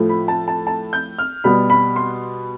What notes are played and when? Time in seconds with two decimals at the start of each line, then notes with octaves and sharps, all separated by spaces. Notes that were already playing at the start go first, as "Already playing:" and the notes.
Already playing: A2 F3 A3
0.09 B5
0.28 A5
0.48 A5
0.67 A5
0.93 G6
1.19 F6
1.44 B2 G3 B3 B5
1.70 B5
1.96 C6